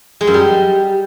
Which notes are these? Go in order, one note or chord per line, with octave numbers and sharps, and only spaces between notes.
G#3
F#2
G3